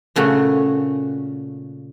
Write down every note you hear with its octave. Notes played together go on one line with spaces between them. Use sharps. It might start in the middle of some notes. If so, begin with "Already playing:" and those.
A#2 C#3 A3 F#4